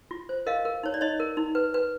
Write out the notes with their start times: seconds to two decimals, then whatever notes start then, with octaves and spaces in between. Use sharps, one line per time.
0.11 F4
0.29 C5
0.46 A#4 D#5 F5
0.65 A#4
0.83 D#4 C#5
0.94 D5
1.01 D#4 C#5 D#5
1.20 A#4
1.37 D#4
1.55 B4
1.74 B4